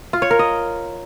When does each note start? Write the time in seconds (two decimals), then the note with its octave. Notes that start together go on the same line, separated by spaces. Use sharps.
0.13 F4
0.22 C#5
0.31 A#4
0.39 D#5